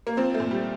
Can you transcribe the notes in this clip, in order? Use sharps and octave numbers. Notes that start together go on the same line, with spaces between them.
A#3
F3 C4
A3
A#2
G3